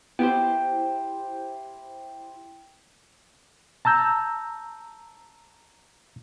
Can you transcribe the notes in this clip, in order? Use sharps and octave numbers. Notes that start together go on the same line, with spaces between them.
B3 E4 G4 C5 G5
A5 A#5 E6 G6